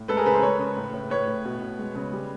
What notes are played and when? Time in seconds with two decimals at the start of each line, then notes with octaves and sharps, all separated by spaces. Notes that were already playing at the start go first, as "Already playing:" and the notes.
Already playing: A2
0.08 G#3 A4 B4
0.17 G#4 A#4
0.26 C#3 A4 B4
0.34 A#4 C5
0.43 G#3 B4 C#5
0.59 C#3
0.77 A2
0.94 A2
1.10 A2 B4 C#5
1.27 A2
1.45 B2
1.62 B2
1.79 G#3
1.95 C#3
2.13 G3